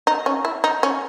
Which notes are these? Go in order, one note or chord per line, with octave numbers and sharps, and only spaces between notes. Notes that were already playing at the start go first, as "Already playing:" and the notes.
D#4
C#4
E4
D#4
C#4